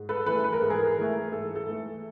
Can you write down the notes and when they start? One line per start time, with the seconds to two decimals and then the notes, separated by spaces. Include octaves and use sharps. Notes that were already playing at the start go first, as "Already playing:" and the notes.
Already playing: G#2
0.09 A4 B4
0.26 E3 A3 A4 B4
0.44 B4
0.53 A#4
0.61 G#2 A4
0.70 G#4 A#4
0.97 E3 A3
1.32 G#2 A4
1.56 A4
1.67 E3 A3